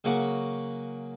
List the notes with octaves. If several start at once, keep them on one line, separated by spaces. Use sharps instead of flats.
C#3 F#3 A#3 F#4